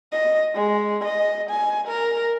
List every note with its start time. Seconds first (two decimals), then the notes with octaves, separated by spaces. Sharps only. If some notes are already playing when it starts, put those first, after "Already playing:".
0.12 D#5
0.54 G#3
1.04 D#5
1.50 G#5
1.88 A#4